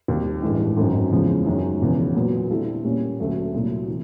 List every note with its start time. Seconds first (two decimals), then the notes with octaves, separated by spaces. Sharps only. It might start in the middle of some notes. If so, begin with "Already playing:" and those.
0.08 D#2 D#3 G3 C4
0.42 A1 G2 E3 G#3
0.77 G#1 F#2 D#3
1.12 E2 C#3 F3 G#3
1.46 F#2 D#3 G#3 C#4
1.81 E1 E2 C#3 F3
2.15 A#2 F#3 B3
2.50 D3 G3 C4 E4 A4
2.84 A#2 G3 A#3 C#4
3.19 D2 D3 F#3 A3 C#4
3.54 C2 A#2 F#3 A3
3.88 E3